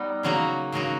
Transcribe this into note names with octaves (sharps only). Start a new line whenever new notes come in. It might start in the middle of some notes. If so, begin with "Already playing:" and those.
Already playing: G3 B3 D#4
C#3 F#3 A#3 D#4 F#4
C#3 F#3 A#3 D#4 F#4